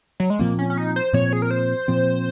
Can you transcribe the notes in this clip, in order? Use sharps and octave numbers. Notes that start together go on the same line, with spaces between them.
F#3
G#3
A#2 F3 A#3 C4
C#4
C#4
D#4
C5
A#2 F3 C4 C#5
G#4
A#4
C5
A#2 F3 C4